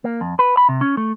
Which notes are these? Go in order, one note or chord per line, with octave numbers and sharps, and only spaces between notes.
A#3
F2
B4
B5
C3
C#4
A3